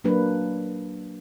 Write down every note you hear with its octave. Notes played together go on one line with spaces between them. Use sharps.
F#3 A#3 D4 B4